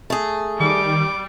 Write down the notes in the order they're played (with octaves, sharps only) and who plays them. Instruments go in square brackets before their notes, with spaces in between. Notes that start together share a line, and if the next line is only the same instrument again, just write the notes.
[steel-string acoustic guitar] A3 G#4
[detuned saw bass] D#3 [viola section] G3 [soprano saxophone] D6